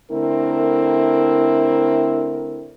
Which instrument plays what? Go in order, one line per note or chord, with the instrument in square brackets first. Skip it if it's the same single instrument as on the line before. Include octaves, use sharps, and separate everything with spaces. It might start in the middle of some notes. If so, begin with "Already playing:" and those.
[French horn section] D3 A3 C4 E4 A#4